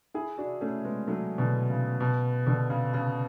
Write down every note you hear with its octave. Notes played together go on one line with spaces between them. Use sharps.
E4 G#4
D4 F#4
A3 C#4
G#3 B3
F#3 A3
B2 D3
C#3
B2
B2 D3
C#3
C#3